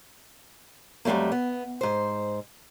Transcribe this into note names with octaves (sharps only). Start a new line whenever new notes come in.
F2 F#3 G3 A3 A#3
B3
G#2 C5